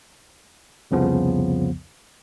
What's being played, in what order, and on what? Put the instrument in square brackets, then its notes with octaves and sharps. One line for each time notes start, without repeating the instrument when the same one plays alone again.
[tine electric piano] C2 F2 C#3 F3 B3